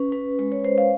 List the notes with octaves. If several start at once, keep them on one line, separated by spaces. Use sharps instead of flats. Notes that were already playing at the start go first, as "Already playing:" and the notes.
Already playing: C#4 B4
C#4 B4
G#3 B4
C#5
C#4 C5
F5